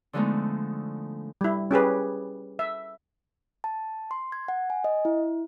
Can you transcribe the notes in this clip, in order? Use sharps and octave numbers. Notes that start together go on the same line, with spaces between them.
D3 F3 G#3 A3 B3 D#4
G3 E4
C#4 G4 G#4 B4
E5
A5
C6
G#6
F#5
G#5
D#5
E4